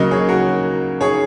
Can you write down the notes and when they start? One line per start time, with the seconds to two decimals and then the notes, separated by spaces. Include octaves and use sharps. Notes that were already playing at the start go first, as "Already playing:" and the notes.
Already playing: C#3 F#3 A#3 A#4 D#5
0.11 G#4 C#5
0.29 F#4 A#4
1.01 G#4 C#5